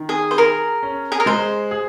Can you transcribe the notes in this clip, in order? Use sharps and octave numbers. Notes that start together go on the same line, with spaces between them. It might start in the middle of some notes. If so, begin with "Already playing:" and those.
Already playing: D#3
G#4
C5
G#4 A#4
C#4
G#4
A#4
G#3 C5
G#4